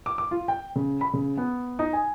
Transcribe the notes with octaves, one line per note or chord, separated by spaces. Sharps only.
D6
D6
F4
G5
C#3
B5
C#3
B3
D#4
G#5